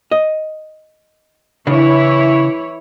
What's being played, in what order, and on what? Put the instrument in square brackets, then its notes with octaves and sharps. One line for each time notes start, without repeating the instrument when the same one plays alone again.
[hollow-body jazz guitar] D#5
[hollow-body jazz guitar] C#3 D4 [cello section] E3 E4 C#5